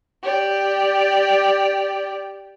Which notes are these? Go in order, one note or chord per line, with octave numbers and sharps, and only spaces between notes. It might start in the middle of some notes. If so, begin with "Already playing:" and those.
G4 D5